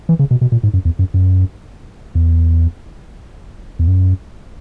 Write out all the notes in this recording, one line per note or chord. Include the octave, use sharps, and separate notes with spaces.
E3
C#3
B2
B2
A#2
G#2
F#2
E2
F#2
F#2
E2
E2
F#2